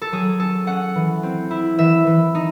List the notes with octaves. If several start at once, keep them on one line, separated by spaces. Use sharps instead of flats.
A4
F#3 G#4
C#4 A4
C#4 F#5
E3
C4
E4
E3 E5
E3
D#4